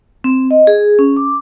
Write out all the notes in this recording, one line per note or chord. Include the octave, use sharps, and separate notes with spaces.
C4
D#5
G#4
C#4
D6